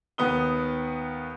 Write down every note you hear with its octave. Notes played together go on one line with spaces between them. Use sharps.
D#2 B3 D#6 G7